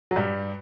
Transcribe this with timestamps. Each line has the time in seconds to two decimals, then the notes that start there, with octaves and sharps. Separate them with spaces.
0.11 F#3
0.16 G2 G3